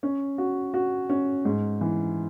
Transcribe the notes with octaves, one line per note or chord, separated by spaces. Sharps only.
C#4
F#4
F#4
C#4
G#2
E3